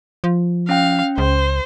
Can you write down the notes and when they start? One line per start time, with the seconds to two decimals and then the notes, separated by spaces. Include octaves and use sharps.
0.24 F3
0.69 C#4 F5 G5
1.18 C#2 C5